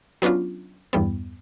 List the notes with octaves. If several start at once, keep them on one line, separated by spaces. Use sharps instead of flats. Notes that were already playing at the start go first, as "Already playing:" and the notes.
F#3 B3 C#4 D4 F4
E2 G2 G3 B3